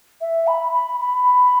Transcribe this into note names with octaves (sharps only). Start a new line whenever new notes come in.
E5
B5
B5
B5